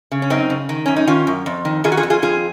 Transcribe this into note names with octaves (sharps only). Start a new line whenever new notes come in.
C#3
C#4
F#2 C4 D#4
C#3
D#3
F#2 C#4
D#4
D#3 C#4 F4
F#2
F2
D#3
D#3 F4 G#4
F#4
F4 G#4
F2
F4 G#4
F2 F4 G#4